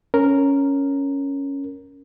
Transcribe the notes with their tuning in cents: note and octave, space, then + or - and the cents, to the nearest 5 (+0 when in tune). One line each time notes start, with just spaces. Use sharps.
C#4 +0 A#4 +0